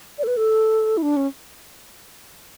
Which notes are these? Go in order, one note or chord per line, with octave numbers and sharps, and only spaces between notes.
D5
A4
B4
A4
E4
D4
C#4